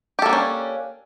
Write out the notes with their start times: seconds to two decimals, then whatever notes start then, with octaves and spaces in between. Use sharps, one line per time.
0.19 G4
0.22 A4
0.26 A#3
0.29 D4
0.33 C#4